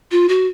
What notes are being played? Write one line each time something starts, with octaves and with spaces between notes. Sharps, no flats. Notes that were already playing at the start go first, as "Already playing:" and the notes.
F4
F#4